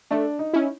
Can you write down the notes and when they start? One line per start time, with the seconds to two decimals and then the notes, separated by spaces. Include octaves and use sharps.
0.11 A3 D4
0.39 D#4
0.53 C#4 E4